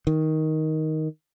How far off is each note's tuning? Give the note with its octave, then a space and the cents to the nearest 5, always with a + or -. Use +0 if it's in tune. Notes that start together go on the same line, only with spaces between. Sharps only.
D#3 +10